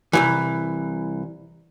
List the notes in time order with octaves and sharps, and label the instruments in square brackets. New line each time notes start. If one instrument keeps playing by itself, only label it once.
[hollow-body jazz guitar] C2 F2 E3